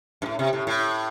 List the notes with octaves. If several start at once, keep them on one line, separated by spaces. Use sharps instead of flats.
G2
A2
C3
A2
A2